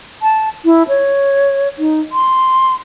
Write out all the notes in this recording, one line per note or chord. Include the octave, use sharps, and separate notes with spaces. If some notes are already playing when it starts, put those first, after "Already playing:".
A5
E4
C#5
D#4
C6